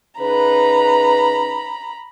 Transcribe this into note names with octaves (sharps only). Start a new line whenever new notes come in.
C#3 D#4 B4 A#5 B5